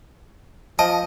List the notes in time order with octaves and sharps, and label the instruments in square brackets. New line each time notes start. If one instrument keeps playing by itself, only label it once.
[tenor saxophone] F3 [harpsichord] D#5 [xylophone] A5